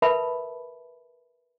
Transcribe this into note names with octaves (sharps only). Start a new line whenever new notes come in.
A#4 B4 E5 A5 B5